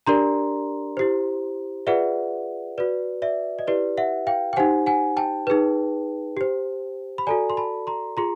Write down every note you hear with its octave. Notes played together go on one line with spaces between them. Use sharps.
D4 G4 A#4 D5 A#5 C6
E4 G4 C5
F4 G#4 B4 D5 E5 F#5
F#4 B4 D5
D5 E5
D#5
E4 G4 B4 D5
E5 F#5
F5 G5
G5
D#4 G4 C5 F#5 G#5
F#5 G#5
G5 A5
D#4 G#4 B4
G4 C5
B5
F#4 A4 D5 G#5 A#5
C6
A5 B5
A#5 C6
F4 G#4 A#5 C6